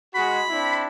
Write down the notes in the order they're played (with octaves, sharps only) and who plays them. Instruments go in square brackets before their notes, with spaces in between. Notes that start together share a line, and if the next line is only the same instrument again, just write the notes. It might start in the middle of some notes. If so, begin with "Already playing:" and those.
[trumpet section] G#3 F#4 [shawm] B5
[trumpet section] C4 D4 E4